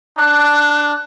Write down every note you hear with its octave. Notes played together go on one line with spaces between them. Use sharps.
D4 F#6